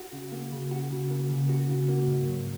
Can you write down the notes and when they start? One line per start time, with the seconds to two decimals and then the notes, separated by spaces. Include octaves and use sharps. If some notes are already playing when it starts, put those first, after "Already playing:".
Already playing: F#4
0.13 C#3
0.32 A#3
0.52 C#3
0.71 F#4
0.91 C#3
1.10 A#3
1.29 C#3
1.49 F#4
1.69 C#3
1.89 A#3
2.08 G#2
2.28 F#3